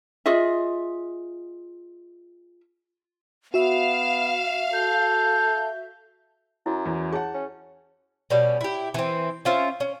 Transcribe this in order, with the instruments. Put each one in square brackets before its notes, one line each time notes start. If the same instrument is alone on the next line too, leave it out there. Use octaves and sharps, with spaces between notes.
[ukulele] F4 G#4 D#5 E5
[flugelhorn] B3 [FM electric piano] F#4 E5 [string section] F5 [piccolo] E7
[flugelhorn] A4 [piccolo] G6
[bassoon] F#2 [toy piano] E4
[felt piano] E2
[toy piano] G#4 C#5 [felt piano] F#5 A5
[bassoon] C#4
[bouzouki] B2 G3 C#4
E4 G4
E3 C4
C#4 F4 C5 E5
C#4